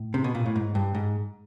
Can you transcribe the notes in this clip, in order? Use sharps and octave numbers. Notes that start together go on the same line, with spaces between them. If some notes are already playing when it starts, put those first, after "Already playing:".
Already playing: A2
C3
B2
A#2
A2
G#2
G2
G#2